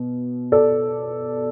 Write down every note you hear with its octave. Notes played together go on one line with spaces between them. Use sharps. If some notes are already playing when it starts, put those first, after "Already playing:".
Already playing: B2
A4 D5